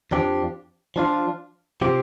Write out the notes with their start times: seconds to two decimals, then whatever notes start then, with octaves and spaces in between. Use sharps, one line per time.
0.11 F2 F3 D4 G4
0.96 F3 D4 F4
1.81 C3 F3 C4 G4